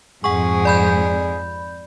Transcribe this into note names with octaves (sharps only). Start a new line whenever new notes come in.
F2 G#2 G#4 F#5 C#6
D5 B5 G6